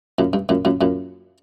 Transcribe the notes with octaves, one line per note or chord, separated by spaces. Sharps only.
F#2 A#2
G2
F#2 A#2
F#2 A#2
F#2 A#2